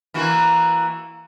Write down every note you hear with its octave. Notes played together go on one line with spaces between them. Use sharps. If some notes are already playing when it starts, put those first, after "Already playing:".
E3 A#3 F#4